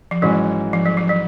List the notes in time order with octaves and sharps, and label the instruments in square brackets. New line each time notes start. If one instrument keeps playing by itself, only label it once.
[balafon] F3
[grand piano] G#2 E3 G#3 C#4 F#4 [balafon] F#3
[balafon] F3
F#3
F3
F#3